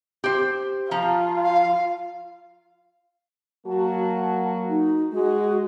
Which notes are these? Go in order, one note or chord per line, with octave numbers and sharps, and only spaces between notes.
G4 C5
F3 F4 A#5
F5
F#3 A#3 F#4 A5
D#4
G#3 F#4